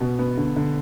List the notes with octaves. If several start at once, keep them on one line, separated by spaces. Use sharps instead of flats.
B2
B3
D3
D3